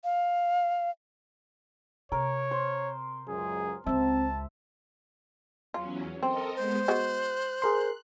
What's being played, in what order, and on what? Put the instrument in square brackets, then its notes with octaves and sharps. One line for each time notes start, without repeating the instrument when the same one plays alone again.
[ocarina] F5
[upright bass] C3 [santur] A#4 [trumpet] C#5
[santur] C5
[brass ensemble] C#2 F#2 [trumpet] G#4
[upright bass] C#2 G#3 [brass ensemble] C4 [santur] E5 [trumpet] A5
[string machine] E2 F#3 C#4 [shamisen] F4
[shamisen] C4 [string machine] A4 A#4 D#5
[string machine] G#3 B3 [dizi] C5
[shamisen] G#3 B3 F#4 [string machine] F#6
[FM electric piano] G#4 A#4 C6